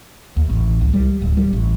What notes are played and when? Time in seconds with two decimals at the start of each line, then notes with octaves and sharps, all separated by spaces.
0.37 D#2
0.50 A1
0.81 C2
0.94 G3
1.22 D1
1.37 G3
1.53 A1